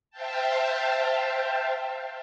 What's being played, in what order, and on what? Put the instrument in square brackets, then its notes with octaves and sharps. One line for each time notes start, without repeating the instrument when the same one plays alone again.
[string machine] C5 E5 F5 G5 A5